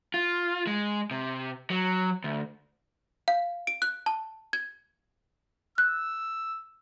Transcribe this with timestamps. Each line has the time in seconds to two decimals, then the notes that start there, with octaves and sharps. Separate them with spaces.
0.14 F4
0.67 G#3
1.11 C3
1.70 F#3
2.24 D2
3.28 F5
3.67 D7
3.82 F#6
4.06 A5
4.53 G#6
5.78 E6 F#6